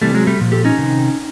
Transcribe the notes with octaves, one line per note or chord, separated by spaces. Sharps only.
C3 E3 G3 A3
F#3 G#3
G3 A3
A#2 F3
G4 A4
C#4 D#4
C3 D#3